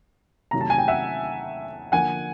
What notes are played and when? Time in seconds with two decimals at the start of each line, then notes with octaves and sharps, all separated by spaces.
0.51 C3 D#3 F#3 A3 A#5
0.61 A5
0.70 G#5
0.78 G5
0.88 E5 F#5
1.92 D3 F3 A#3 F#5 G#5